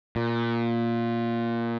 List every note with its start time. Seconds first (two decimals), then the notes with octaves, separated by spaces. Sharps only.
0.16 A#2